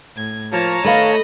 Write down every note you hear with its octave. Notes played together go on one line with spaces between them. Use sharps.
A2 G#6
F3 A#3 C#5 A5 A#5
D#3 A3 B4 D#5 F5 B5 A#6